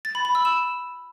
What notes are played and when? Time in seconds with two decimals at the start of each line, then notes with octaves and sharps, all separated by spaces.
0.05 A6
0.15 B5
0.25 B5
0.35 E6
0.45 E7